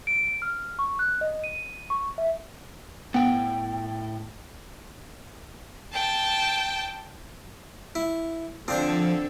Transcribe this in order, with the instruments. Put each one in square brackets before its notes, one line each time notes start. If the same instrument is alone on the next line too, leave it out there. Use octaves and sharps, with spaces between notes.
[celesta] D7
F6
C#6
F#6
D#5
D#7
C#6
E5
[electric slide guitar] A2 G5 [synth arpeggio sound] B3 F#5
[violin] G5 A5
[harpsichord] E4
[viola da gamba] D3 A4 [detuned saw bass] F3 [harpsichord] C4 D4 C5